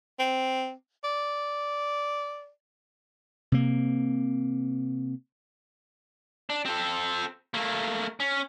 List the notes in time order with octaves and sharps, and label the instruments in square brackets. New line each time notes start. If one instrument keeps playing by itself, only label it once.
[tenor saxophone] C4
D5
[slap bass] C3 A#3
[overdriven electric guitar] D4
C4 A4
A3 A#3
C#4